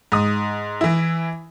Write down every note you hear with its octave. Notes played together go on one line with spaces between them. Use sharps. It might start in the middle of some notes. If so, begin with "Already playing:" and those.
G#2 D#6
E3 E4